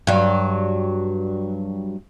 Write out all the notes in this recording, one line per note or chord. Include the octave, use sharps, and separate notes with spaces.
G2 F#3